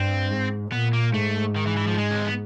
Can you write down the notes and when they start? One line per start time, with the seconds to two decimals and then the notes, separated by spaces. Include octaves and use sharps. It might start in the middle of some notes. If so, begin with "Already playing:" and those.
Already playing: G2 C4
0.30 G#2
0.72 A#2 B3
0.93 A#3
1.14 G#2 A3
1.56 D#3
1.67 E3
1.77 E3
1.87 F3
1.93 G3
1.98 G#3
2.11 C#4
2.17 C4
2.25 B3